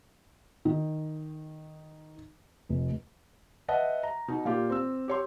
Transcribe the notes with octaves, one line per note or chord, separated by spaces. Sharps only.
D#3
F1
B4 D#5 E5 F#5 A5
A#5
B2 D#4
A#2 F4 G4
C4 E6
G4 C#5 C6